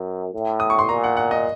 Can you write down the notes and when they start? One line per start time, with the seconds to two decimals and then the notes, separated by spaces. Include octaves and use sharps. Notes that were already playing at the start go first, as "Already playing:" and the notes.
Already playing: F#2
0.34 A2
0.60 D#6
0.70 C#6
0.79 C6
0.89 A#2 A#5
1.04 F#5
1.17 F#5
1.31 D#5